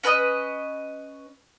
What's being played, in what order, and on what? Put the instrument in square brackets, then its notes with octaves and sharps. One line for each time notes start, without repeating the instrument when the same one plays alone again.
[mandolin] C#4 B4 C5 D#5